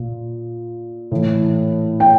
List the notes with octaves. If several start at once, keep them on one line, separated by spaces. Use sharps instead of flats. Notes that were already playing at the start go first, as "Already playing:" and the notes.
Already playing: A#2
A2 E3
G5